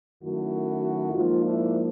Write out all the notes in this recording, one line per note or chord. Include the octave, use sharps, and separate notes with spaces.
F#2 D#3 F#3 A3 E4 F#4
G#2 F3 A#3 D#4 F4
D4 E4